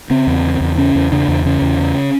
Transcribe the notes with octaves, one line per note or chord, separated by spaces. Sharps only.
C#3 C4
E2
C#3
E2
C#3 C#4
E2
C#3 D4
E2
C#3 C#4
E2
C#3